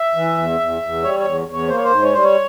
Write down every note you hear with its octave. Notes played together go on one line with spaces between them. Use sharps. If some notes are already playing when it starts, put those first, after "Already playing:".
Already playing: E5
E3
E2
E2
E2
G3 C#5
C#5
E2
E2 C#5
A#3 C5
C#5
C5
G#2
C#5
G3 C5
C#5